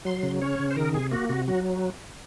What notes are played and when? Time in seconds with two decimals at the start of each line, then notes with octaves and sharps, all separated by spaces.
0.05 F#3 C6
0.23 C#3
0.41 C#4 C#5
0.59 C#3
0.71 C5
0.77 D#3 A#4
0.94 C3 G#4
1.12 A#3 F#4
1.29 C3 F#4
1.48 F#3 F#4